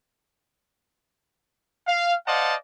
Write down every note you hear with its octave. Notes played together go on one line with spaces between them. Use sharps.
F5
C5 D5 D#5 F5 F#5 A5